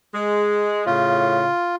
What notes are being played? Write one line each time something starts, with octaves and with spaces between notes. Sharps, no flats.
G#3
A2 C#3 F4